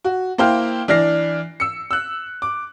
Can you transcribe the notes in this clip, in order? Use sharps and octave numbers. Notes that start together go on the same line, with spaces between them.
F#4
A#3 E4 C5 G5 F6
E3 D4 D5 F6 A#6 C7
E6 C#7
E6 F#6
D6